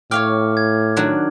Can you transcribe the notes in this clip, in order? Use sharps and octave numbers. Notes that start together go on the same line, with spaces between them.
A2 C#5 F5 G5 D6 F6
G#6
D#3 F#3 D4